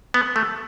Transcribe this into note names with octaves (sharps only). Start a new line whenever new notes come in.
B3
A3